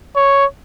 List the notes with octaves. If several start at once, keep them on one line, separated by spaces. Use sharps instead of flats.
C#5